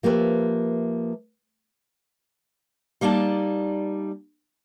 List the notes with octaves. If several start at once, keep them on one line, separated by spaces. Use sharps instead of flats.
F3 A#3 G4 B4 E5
G3 A#3 D#4 D5 A5